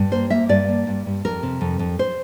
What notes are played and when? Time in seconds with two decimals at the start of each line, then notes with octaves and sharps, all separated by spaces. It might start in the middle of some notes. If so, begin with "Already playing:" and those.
Already playing: G2
0.12 A#3 C5
0.30 A#3 E5
0.49 G2 D5
0.68 A#3
0.87 G2
1.06 G2
1.25 F2 A#4
1.43 C3
1.61 F2
1.79 F2
1.99 C5